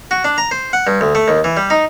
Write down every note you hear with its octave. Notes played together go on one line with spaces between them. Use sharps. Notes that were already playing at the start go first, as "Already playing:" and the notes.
F#4
D4
A#5
C5
F#5
G2
D2
A3
D#2
E3
G3
D#4